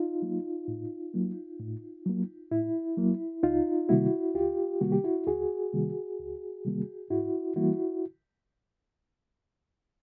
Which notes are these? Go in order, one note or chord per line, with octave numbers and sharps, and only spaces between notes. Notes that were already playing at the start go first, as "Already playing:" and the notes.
Already playing: D#4 F4
F#3 A#3
A2
F#3 A#3
A2
F#3 A#3
A2 E4
F#3 A#3
C#2 D#4 F4
C3 D#3 G3 A#3 E4 F#4
C#2 F4 G4
C3 D#3 G3 A#3 F#4
G4
E4 F#4
C#2 F#4 G#4
C3 D#3 G3 A#3
C#2
C3 D#3 G3 A#3
G#2 E4 F#4
E3 G3 A#3 E4 F#4